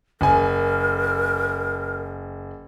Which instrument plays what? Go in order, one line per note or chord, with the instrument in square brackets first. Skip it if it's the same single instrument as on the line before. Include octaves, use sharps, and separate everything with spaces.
[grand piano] F#1 G#5 [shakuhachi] A#4